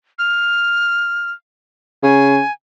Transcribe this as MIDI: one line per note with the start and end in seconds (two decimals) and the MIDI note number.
0.19 1.31 89
2.03 2.40 49
2.03 2.52 80